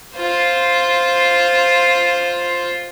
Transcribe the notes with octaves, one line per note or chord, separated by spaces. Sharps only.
F4 C5